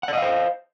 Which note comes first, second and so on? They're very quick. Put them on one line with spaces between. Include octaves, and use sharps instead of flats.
F#5 D5 D#5 F5 C5